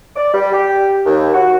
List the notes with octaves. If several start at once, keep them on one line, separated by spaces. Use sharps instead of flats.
D5
G3
G4
D#2
F#4